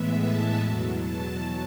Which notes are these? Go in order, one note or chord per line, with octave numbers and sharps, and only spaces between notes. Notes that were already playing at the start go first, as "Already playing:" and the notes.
Already playing: A2 E3 G#3 B3 E5
A5
E2 B2 F#3
A5